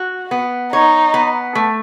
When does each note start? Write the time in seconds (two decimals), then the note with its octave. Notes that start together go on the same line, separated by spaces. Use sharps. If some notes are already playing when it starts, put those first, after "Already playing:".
Already playing: F#4
0.31 B3
0.72 D#4 C#5
1.14 B3
1.55 A3